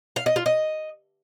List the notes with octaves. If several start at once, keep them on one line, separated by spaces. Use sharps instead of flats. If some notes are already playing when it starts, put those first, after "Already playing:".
F5
D#5
F4
D#5